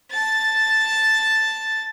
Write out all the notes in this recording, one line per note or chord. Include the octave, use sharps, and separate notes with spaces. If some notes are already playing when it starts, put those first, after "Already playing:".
A5 A6